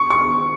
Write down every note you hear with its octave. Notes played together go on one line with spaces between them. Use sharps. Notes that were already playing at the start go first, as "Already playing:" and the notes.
Already playing: C#6
C#6